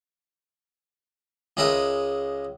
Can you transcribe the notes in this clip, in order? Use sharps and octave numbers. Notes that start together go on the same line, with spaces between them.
C#2 G#3 A#4 B4 E5 D#6